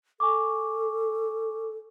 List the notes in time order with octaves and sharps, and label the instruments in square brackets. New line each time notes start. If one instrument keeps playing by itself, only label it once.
[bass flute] A4 [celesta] G#5 C#6 D6